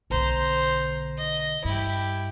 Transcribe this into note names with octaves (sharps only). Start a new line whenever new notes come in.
B1 D3 C5 A#5
D#5
G2 E4 G4